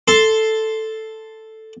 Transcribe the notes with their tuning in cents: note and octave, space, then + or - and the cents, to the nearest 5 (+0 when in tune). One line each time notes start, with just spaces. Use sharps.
A4 +0 C6 +0